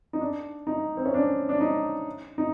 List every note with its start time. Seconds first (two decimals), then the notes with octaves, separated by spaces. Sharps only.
0.13 D#4
0.21 D4
0.67 D#4
0.97 C4
1.06 C#4
1.14 D4
1.49 D4
1.61 D#4
2.38 D#4